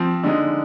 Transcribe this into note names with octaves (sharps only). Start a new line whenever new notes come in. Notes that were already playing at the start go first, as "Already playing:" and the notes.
Already playing: F3 C4
D3 G#3 D#4